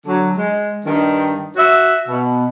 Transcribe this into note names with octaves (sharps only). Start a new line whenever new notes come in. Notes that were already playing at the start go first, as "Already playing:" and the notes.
D3 F#3
G#3
G2 D#3
F#4 E5
B2